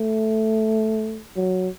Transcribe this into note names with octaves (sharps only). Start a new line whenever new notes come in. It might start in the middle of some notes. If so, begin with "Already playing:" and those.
Already playing: A3
F#3